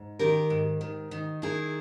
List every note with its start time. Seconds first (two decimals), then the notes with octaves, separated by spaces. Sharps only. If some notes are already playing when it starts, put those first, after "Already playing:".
Already playing: G#2
0.19 D#3 G4 A#4
0.50 G#2
0.81 D#3
1.11 D#3
1.42 D#3 E4 G#4